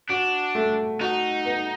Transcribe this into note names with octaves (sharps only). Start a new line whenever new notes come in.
D4 F#4
A3
D#4 F#4
B3